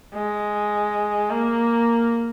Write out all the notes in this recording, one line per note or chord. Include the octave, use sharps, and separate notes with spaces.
G#3
A#3